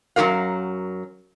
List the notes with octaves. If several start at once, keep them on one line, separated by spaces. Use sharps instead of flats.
F#2 F#3 G#3 G4 A#4 F5